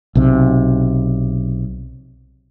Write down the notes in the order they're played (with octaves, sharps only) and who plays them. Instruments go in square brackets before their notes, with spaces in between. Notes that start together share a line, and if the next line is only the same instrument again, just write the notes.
[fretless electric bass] B1 C3